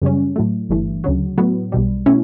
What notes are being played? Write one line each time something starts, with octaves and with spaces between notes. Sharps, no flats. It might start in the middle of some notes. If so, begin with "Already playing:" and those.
F#2 C#3 G3 C#4
A2 F#3 A3
G1 G2 E3 A3
D2 C#3 F#3
A2 F#3 B3
B1 B2 G3
B2 A3 C#4 E4